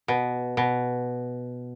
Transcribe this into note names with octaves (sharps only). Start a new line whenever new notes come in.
B2
B2